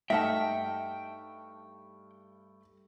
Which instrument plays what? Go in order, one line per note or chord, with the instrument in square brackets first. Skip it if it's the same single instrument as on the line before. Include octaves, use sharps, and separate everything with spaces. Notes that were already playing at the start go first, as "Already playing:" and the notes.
[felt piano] G2 A3 F6 [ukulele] D#4 F#5 A5 [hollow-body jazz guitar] E5 [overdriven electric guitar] G5